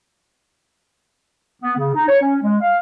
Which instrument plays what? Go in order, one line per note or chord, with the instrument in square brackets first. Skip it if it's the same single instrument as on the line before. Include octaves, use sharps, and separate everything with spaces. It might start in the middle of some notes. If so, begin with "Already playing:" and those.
[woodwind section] B3
C#3
D#4
C#5
C#4
G#3
F5